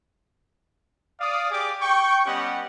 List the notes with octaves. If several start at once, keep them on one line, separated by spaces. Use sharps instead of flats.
D5 F5 D#6
G4 G#4 D5 D6
G5 C#6
G3 B3 C#4 G4 D#5 F#5